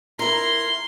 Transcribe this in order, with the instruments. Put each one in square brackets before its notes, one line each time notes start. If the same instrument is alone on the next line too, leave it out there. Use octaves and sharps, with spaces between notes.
[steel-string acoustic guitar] E4 A#4 [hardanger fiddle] C6